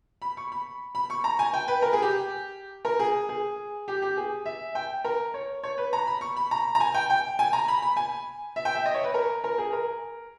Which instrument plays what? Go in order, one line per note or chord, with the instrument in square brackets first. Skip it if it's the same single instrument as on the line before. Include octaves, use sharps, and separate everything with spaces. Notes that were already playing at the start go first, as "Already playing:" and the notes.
[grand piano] B5
C#6
B5
B5
C#6
A#5
G#5
G5
B4
A#4
G#4
G4
A#4
G#4
G#4
G4
G4
G#4
E5
G5
A#4
C#5
C#5
B4
A#5
B5
C#6
B5
A#5
A#5
G#5
G5
G5
G#5
A#5
B5
B5
G#5
E5
G5
E5
D#5
C#5
B4
A#4
A#4
G#4
A#4